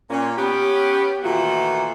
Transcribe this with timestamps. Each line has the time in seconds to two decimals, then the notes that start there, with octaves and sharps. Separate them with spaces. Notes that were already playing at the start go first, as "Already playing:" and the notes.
0.10 A#2 C#4
0.37 B3 C#4 G4
1.23 A#2 D#3 E3 A3 F4 F#4